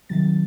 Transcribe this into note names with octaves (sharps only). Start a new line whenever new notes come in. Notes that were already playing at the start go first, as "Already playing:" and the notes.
C3 D#3 F#3 A6